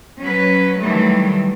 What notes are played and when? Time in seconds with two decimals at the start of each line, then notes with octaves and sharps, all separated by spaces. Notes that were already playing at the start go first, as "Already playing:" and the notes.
0.20 F#3 C#4 B4
0.78 D#3 E3 F#3 G3 A3